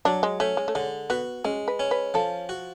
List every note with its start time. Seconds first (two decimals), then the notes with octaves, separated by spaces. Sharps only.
0.05 F#3 D4
0.23 G#3
0.40 A3 C#4
0.57 G#3
0.68 A3
0.75 D3 G#3
1.10 B3 F#4
1.45 G#3 C#4
1.68 B4
1.79 C#4
1.91 B4
2.14 F3 A4
2.49 F#4